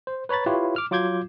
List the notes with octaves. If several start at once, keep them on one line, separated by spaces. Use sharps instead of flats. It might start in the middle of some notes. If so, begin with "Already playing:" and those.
C5
B4 C#5 A#5 B5 A6
E4 F4 G4 B4 C#5
D6 F6
F#3 F4 D6 G6 G#6